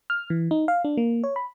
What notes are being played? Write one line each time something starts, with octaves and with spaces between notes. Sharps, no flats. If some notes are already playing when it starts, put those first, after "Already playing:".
F6
E3
D#4
F5
D4
A#3
C#5
B5